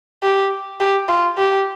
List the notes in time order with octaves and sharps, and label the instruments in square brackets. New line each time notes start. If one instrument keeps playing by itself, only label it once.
[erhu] G4
G4
F4
G4